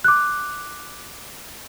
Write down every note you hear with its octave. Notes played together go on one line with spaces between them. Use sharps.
D6 F#6